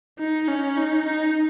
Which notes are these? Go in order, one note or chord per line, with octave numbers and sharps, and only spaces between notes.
D#4
C#4
D#4
D#4